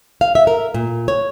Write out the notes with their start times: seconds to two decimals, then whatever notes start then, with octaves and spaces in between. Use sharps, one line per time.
0.21 F5
0.35 E5
0.47 A#4
0.74 A#2
1.08 C#5